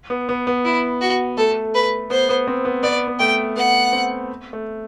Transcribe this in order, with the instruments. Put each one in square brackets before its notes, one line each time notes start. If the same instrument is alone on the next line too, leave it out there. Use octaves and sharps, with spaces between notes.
[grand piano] B3
B3
B3
[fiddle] E4
F#4
[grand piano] A3 [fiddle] A4
[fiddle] B4
[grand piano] B3 [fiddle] C5
[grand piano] B3
C4
B3
[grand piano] B3 [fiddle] D5
[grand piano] B3
[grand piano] A3 [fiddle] G5
[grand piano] B3 [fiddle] F#5
[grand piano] C4
A3